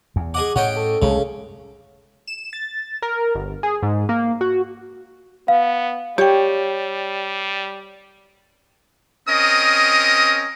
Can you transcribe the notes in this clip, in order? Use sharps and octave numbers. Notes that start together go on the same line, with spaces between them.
E2
G#4 D#5 F#5 D6
A2 C#4 D#5 F#5 G5
A4
C2 C#3 G#3 A3
E7
A6
A#4
G1
G#4
G#2
A#3
F#4
B3 F5
G3 G4 C#5 G5
C4 C#4 A#4 D#5 D#6